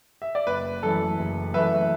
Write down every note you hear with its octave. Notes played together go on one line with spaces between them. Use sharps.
E5
D5
F#1 B4
F#2 E3 A3 A4
F#1
F#2 E3 A3 B4 E5